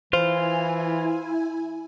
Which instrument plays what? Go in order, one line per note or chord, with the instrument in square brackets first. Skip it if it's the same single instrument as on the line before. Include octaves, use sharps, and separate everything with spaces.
[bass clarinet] E3 [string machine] E4 G#5 [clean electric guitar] F4 [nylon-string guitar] C5